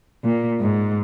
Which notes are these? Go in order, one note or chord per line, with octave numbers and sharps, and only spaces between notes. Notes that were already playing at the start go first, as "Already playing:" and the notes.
A#2
G#2